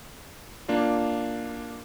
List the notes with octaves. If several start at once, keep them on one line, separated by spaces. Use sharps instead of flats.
A#3 D4 F4